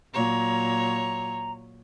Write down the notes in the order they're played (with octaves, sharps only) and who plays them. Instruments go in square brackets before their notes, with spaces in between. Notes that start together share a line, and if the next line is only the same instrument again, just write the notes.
[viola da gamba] A#2 F#3 C#5 [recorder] A#5